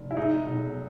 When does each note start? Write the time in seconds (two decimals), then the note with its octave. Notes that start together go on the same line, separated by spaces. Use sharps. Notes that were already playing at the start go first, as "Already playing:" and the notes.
Already playing: F1
0.11 E4
0.17 G#3 D#4
0.46 B1